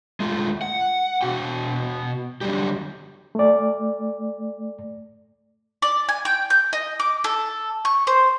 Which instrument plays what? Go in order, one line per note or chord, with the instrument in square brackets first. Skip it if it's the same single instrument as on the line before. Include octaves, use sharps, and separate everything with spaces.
[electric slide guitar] G#3 A3 F4
F#5
B2 F#4 G5
D3 F#3 G3 G4
[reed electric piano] A3 D5
[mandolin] D5
G#5
G5
G6
D#5
D6
A4
C#6
C5